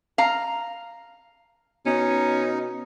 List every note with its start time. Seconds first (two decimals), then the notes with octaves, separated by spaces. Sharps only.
0.18 F5 A#5
1.86 B2 C#4 D#4